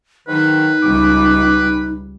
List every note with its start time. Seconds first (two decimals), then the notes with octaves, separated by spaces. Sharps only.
0.28 G#2 D#3 F#3 D#4 B4
0.83 C#2 G3 D6